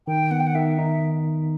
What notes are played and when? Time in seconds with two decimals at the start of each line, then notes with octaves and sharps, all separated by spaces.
0.07 D#3 G5
0.31 B3 F#5
0.40 G5
0.47 F#5
0.55 D#3 E5
0.79 D#4